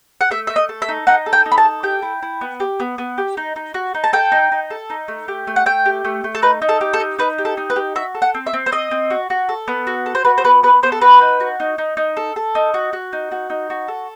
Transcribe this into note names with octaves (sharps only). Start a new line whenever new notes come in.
F#5
A3 E5
A3 E5
D#5
A4
E5
D#4
D#4 F#5
A4
G5
D#4
B5
A5
A4
G4 G5
E4
E4
B3
G4
B3
B3
G4
D#4
D#4
F#4
D#4
A5
A4 G5
D#4
D#4
A4
D#4
A3
G4
A3
F#5
A3 G5
G4
A3
A3
A4
D#4 B4
D#4
A4
G4
A4
D#4
D#4 B4
G4
A4
D#4
B4
G4
F#4 E5
A4
F#5
C4
E5
C4
C5
C4 D#5
C4
F#4
F#4
A4
B3
F#4
A4
C5
F#4 B4
C5
B3 B4
B3 B4
B3 C5
A4
F#4 B4
D#4
F#4
D#4
D#4
D#4
A4
A4
D#4
F#4
F#4
D#4
F#4
D#4
F#4
A4